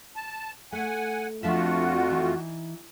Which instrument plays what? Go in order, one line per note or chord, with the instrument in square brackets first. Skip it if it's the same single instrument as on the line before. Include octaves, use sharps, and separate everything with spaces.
[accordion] A5
[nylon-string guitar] A3 [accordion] F#5 G#5
[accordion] F2 A3 F4 [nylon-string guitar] F3 D4 E5 [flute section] F#4
[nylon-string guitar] E3 D#4